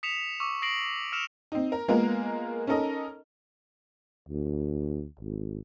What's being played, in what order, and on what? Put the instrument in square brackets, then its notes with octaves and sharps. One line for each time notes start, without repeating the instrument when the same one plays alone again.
[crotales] D#6 B6 C#7 E7 F7
C#6 D6 E6
D#6 A#6 C7 D7 F#7
E6 F6 C#7 E7 F7
[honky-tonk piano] C4 D#4
A#4
G#3 A#3 B3 F4 A#4
C#4 D#4 A4 A#4 D#5
[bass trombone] D2
G#1